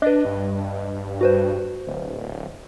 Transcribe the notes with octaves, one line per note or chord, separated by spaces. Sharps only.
D4 B4 D#5
G2
F#4 B4 C5
D1